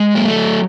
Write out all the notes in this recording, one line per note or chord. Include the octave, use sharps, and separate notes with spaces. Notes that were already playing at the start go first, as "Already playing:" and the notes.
Already playing: G#3
F#3 A#3
A3
F#3